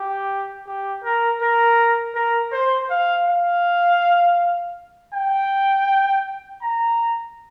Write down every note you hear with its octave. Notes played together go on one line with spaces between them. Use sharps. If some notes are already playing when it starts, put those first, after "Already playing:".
Already playing: G4
G4
A#4
A#4
A#4
C5
F5
F5
G5
A#5